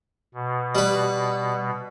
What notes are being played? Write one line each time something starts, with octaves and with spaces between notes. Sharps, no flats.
B2
G3 B4